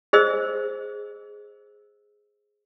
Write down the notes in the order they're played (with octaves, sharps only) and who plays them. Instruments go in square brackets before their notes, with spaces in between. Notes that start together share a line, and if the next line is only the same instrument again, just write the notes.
[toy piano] G#4 C5 D#5 E6